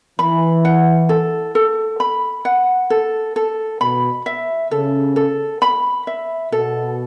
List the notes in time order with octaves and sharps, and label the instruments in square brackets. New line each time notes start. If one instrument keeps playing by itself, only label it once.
[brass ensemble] E3 [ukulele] B5
[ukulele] F#5
A4
A4
B5
F#5
A4
A4
[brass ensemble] B2 [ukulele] B5
[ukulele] E5
[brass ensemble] C#3 [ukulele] A4
[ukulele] A4
B5
E5
[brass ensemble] B2 [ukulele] A4